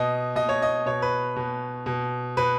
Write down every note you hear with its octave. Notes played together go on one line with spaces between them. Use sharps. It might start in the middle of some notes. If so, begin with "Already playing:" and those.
Already playing: B2 D#5
B2 D#5
C#5
D#5
B2 C#5
B4
B2
B2
B2 B4